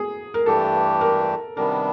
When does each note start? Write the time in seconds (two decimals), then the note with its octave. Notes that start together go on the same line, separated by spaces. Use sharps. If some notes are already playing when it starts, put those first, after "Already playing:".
Already playing: G#4
0.34 A#4
0.46 G2 E3 A3 D4 G4 A4
1.01 A#4
1.57 C3 D#3 G3 B3 D4 A#4